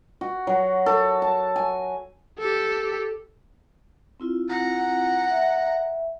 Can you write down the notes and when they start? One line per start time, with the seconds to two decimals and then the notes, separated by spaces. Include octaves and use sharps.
0.21 F#4
0.47 F#3
0.86 A4
1.22 A5
1.56 G#5
2.39 G4 A4
4.20 C4 E4 F4
4.49 F#5 A#5
5.30 E5